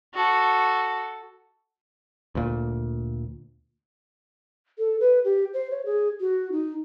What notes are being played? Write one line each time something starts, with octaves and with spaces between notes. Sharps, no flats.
F#4 A4
D2 A#2
A4
B4
G4
C5
C#5
G#4
F#4
D#4